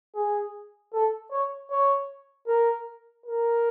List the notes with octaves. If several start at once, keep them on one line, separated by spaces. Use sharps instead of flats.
G#4
A4
C#5
C#5
A#4
A#4